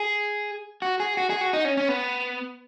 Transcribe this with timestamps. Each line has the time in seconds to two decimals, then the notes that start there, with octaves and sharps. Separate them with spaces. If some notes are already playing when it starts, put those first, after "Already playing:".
Already playing: G#4
0.82 F#4
1.00 G#4
1.17 F#4
1.30 G#4
1.41 F#4
1.53 D#4
1.65 C#4
1.77 C#4
1.89 B3